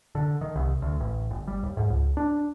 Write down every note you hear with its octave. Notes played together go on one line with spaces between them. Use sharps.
D3
D#3
C2
D2
A1
G1
G3
D#2
G#2
C#2
D4